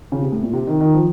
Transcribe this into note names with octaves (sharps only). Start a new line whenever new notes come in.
C#3
C3
A2
A#2
C3
D#3
D#3
F3